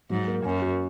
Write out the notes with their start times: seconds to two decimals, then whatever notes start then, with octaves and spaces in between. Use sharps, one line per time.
0.10 G#2 F#3
0.27 A#3
0.45 F#2 C#4
0.62 F#4